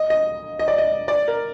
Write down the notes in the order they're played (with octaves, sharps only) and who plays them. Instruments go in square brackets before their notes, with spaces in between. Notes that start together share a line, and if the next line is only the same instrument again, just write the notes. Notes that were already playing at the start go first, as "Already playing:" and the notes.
Already playing: [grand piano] D#5
D#5
D#5
D5
D#5
D5
A#4